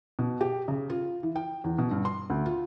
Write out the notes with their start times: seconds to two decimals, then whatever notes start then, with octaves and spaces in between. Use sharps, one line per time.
0.19 B2
0.41 G4
0.68 C#3
0.90 F4
1.23 E3
1.36 G5
1.64 E2
1.78 B2
1.91 G2
2.05 C6
2.30 D2
2.46 F4